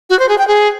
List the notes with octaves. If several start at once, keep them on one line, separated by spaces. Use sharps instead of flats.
F#4
C5
G#4
G5
G#4